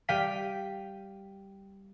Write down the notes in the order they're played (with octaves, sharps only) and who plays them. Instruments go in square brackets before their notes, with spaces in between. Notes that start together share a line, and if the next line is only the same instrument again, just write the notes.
[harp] G3 F5 G5 B6 D#7